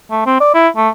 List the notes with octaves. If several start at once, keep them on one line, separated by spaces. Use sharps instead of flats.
A3
C4
D5
E4
A3